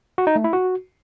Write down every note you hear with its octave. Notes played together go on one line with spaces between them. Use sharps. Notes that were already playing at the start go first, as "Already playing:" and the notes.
F#4
D#4
A3
E4
F#4